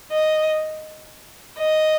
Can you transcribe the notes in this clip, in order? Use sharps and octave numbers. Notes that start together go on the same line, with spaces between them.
D#5
D#5